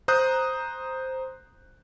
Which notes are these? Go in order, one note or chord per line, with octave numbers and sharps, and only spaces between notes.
C5 A#5 D#6 F#6 G6